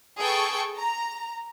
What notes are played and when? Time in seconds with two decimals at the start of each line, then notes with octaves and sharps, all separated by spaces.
0.18 G#4 A4 B4 G5 A5 C#6
0.77 A#5